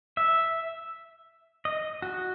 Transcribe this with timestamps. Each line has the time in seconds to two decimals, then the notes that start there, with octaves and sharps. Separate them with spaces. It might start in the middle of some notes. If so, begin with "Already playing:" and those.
0.17 E5
1.65 D#5
2.02 F#4